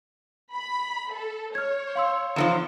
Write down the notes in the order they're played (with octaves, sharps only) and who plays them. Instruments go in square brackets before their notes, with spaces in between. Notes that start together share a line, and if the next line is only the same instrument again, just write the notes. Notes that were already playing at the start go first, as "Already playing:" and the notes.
[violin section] B5
A4
[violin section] C#5 [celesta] F6 G#6
[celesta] F5 C6 E6
[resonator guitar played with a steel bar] E2 D#3 F3